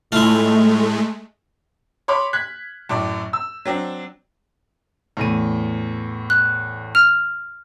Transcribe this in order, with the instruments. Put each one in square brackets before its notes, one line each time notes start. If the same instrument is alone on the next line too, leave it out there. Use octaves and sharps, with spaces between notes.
[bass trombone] A2 [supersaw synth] G#3 A3 [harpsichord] E4 F4
[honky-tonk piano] C#5 B5 C6 D6
F#6 G#6 B6
F#2 A2 D5
E6
F#3 C4 D4
[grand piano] E2 A2 D#7
[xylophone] F#6
F6 F7